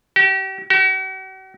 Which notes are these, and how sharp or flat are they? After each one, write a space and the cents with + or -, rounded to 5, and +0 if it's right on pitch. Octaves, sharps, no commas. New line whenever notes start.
G4 -40
F#4 +45